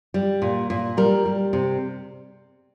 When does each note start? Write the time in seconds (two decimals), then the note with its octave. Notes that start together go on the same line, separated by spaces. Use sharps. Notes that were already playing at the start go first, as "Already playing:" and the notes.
0.14 G3
0.42 A#2
0.70 A#2
0.97 G3 A#4
1.26 G3
1.53 C3